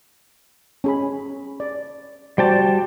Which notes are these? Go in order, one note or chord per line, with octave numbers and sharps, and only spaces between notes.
C#4 G#4 B5
D5
G3 F#4 C5 D5 G5 A5